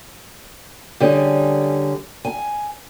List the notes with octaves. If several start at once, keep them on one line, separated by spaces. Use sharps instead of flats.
D3 G3 C#4 G#4
G#5